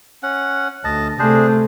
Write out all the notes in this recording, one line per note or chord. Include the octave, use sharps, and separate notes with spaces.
C#4 F#5
D2 D#5 A5
C3 A3 D4 G#4 C5